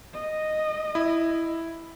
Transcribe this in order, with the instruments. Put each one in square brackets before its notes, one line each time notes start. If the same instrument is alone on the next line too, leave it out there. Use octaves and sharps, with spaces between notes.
[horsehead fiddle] D#5
[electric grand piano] E4